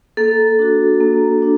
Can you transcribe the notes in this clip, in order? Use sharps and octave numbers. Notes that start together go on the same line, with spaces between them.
A#3 A4
D4 F#4
A#3
D4